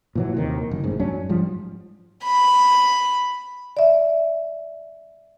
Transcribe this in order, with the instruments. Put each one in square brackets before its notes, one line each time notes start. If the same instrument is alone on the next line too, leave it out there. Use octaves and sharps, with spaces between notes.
[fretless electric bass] A#2 E3 F#3
D#2 C3 D#3
F#1
A1 G#2
F#2 F#3 C#4 D4
G#2 F3 G3
[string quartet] B5
[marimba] D5 E5